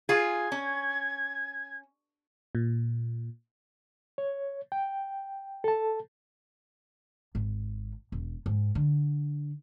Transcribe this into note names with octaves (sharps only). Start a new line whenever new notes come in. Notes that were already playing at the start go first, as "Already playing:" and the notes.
F4 G#4 G#6
C#4
A#2
C#5
G5
A4 A5
G#1
E1
G#2
D3